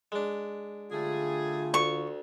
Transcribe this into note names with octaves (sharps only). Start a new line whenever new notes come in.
G#3 D4
D3 G3 A3 F4 G#4
D2 C#6